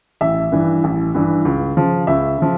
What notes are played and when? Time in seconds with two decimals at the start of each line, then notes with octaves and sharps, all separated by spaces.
0.21 A1 E5
0.52 G2 E3
0.84 A1
1.15 G2 E3
1.45 C#2
1.77 C#3 F3
2.07 C#2 E5
2.38 C#3 F3